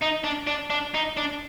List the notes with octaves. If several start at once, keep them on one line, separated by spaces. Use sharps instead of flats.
D#4
D4
D4
D4
D#4
D4